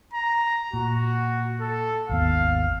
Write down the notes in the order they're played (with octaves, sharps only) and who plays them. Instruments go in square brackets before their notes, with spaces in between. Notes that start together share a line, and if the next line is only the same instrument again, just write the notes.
[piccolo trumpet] A#5
[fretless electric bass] A#2 [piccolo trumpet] F#4
[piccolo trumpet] A4
[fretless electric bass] G#1 D#2 B3 [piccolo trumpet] F5